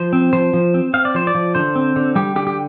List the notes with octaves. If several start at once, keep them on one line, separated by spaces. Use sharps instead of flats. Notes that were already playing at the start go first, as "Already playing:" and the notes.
Already playing: F3 C5
C4
F3 C5
F3
C4
C4 F5
D5
F3 C5
D5
F3
D3 C5
C4
D3
G3 G4
D3 G4
G4